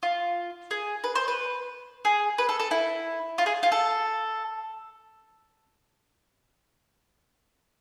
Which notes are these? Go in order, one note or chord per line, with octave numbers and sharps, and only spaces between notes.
F4
G#4
B4
C5
B4
G#4
B4
A4
A4
E4
F4
G#4
F4
A4